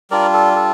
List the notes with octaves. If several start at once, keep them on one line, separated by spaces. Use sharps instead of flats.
G3 D4 F4 A#4 D5
A4
A4